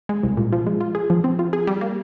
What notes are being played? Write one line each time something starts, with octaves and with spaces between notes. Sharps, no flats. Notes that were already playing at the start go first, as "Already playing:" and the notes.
G#3
C2
A#2
F3
G#3
F4
G#4
F3
C4
F4
G#4
G3
A#3